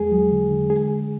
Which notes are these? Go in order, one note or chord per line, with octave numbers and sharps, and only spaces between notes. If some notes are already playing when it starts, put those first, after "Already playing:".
Already playing: E2 G#3 G#4
F#3
D3
D3
G#3 G#4